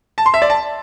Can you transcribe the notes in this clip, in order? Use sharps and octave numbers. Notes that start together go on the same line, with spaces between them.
A5
C6
E5
D5
A5